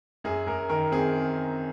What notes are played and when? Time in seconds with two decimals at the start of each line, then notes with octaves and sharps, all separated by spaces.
0.24 F#2 G#4
0.47 F#2 A#4
0.69 D#3 A#4
0.92 C4 G#4